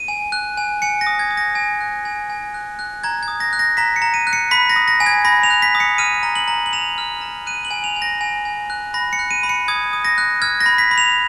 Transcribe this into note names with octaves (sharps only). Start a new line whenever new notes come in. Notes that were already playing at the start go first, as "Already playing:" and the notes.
Already playing: D#7
G#5
F#6
G#5
G#5 C#7
A#6
D#6
G#6
D#6
A#6
G#5
F#6
G#5
G#5
F#6
F#6
A#5 G#6
G#6
D#6
A#6
F#6
A#6
A#5 B6
C#7
A#5
D#7
F#6
C#7
B5 B6
A#6
D#6
A#6
G#5
G#6
B5 A#6
F7
F#6
B6
D#6
C#7
F6 D#7
A#5
F#7
A#5
F#7
A#5 F7
F6
A#5
F#6 D#7
F#7
G#5
F7
G#5
A#6
G#5
G#5
F#6
B5 A#6
C#7
F#6
D#7
B5
C#7
D#6 G#6
D#6
A#6
F#6
F6 G#6
A#6
B5
B6
B5
F7